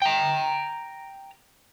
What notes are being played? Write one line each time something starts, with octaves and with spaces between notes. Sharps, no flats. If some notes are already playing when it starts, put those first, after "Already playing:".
G5 A#5